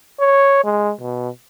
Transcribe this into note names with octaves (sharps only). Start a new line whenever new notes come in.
C#5
G#3
B2